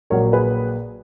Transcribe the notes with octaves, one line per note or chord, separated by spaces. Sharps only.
A#1 A#2 F#3 A#4 C#5
G#4 B4